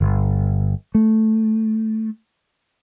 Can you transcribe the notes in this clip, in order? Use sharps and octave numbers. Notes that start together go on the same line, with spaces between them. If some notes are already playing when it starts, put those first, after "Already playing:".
G1
A3